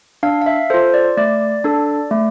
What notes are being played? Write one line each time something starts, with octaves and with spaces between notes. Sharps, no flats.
D4 F5
F5
E5
F4 A4 C5
D5
A3 D5
D4 A4
A3